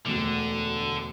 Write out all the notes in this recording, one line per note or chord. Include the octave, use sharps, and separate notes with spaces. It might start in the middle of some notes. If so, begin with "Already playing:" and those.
E1 D2 D3